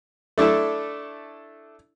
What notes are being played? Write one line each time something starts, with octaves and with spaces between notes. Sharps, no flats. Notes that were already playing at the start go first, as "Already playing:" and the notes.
A3 D4 E4 A4